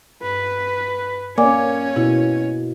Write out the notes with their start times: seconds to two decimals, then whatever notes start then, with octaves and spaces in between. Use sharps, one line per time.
0.23 G2 B4
1.38 A#3 C#4 C#5 D5 G#5 D6
1.96 B2 E4